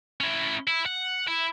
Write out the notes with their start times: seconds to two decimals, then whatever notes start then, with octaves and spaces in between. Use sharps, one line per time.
0.21 C#4 E4
0.68 E4
0.86 F#5
1.27 E4